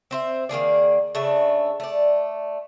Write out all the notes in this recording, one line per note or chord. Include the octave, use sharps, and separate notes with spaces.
C4 C5 E5
D#3 A#3 G#4 D5
C#3 A3 D4 E5
A3 D5